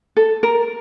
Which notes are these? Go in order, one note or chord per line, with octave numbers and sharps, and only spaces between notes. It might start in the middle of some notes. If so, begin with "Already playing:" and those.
A4
A#4